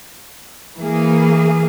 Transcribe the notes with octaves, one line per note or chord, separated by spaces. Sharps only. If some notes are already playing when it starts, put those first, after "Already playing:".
E3 A#3 G#4